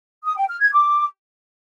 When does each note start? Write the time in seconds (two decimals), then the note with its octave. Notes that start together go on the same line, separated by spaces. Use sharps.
0.25 D#6
0.37 G5
0.49 F6
0.61 G#6
0.73 D6